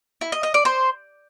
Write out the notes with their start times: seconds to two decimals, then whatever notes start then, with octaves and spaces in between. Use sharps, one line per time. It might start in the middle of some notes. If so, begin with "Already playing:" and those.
0.21 E4
0.32 D#5
0.43 D#5
0.54 D5
0.65 C5